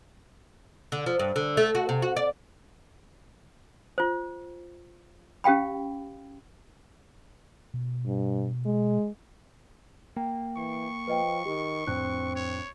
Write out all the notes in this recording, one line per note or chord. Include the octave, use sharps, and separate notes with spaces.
D3
F3
G2
D3
A3
F#4
C3
F#4
D5
F4 C5
C#4 G4 F5 G5 B5
B2
G2
G#3
A#3 G5
E3 C#6
F3 B4 D#5 G5
D#3 G4
F2 A2 C4 D4 F#6
C#5